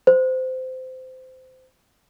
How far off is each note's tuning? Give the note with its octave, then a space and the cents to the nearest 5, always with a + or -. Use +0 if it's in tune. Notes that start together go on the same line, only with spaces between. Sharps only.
C5 -20